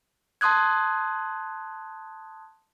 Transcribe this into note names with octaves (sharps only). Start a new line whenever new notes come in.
A5 C6 D#6 F#6 G#6